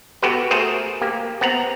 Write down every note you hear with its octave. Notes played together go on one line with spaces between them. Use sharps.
B3 F#4 G4 A4 B4
A3 F#4 G#4 A#4 C5
A#3 G4
B3 C4 F#5 A#5